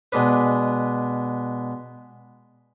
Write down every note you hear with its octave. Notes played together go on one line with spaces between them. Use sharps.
B2 G#3 D4 B4